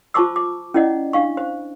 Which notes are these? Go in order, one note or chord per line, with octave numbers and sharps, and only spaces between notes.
F4 C5 A5 C#6 D6 E6
D6
C#4 E4 D5 D#5 F#5
D4 F5 C#6
C5